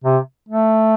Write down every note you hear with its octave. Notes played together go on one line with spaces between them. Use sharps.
C3
A3